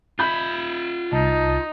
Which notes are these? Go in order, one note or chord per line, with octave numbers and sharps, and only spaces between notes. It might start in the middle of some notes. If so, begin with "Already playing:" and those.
F4 E5 B5 G6
C2 D#4 A5